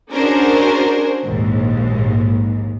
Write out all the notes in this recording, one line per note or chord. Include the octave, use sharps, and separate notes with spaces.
C#4 D4 F#4 G#4 A#4 C5
A#1 D#2 G#2